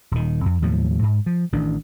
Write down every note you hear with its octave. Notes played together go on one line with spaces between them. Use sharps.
D#1 D#3
F2
D#2 A2 F3 F#3
G#2
F3
A1 D#3 D4